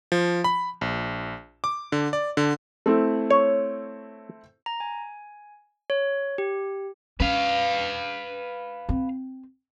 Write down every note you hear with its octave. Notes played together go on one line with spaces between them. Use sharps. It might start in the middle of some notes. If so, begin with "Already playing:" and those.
F3
B5
A#1
D6
D3
D5
D3
A3 C4 E4
C#5
A#5
G#5
C#5
G4
C#4 B4 F5
C4